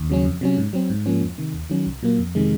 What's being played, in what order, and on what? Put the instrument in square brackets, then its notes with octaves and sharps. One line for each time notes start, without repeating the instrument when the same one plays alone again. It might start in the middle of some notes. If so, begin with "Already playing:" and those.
Already playing: [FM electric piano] D#2
C#3 F#3 C#4
F2
C3 F#3 C#4
G#2
F#3 C4
G#2
F3 A#3 C#4
F2
C3 D#3
D#2
D#3 F#3 C#4
C2
A#2 F#3 A#3
F2
C3 D#3 G#3